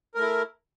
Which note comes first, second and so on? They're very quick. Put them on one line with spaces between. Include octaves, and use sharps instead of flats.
A#4 A3 E4